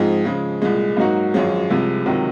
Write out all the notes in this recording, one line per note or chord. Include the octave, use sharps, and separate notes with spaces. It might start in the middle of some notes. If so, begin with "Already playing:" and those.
Already playing: G#2 F3 C4 D#4 G#4
C#3 F3 G#3
C2 A#2 G#3
G#2 F#3 A#3 D#4 F#4
G#1 F#2 F3 G#3 C#4
C2 C3 F3 G#3
C#2 C3 D#3 F#3